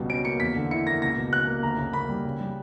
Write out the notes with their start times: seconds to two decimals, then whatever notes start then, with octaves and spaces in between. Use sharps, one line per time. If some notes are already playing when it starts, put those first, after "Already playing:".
Already playing: C#2 B2 G3
0.09 C#4 D7
0.25 A#3 C#7
0.40 E2 B6
0.56 D3
0.71 E4 C#7
0.87 A#3 A#6
1.02 C#2 A#6
1.17 B2
1.32 C#2 F#6
1.47 A#3
1.63 D2 A#5
1.78 C#3
1.93 A#3 B5
2.09 G3
2.25 C#3
2.40 G3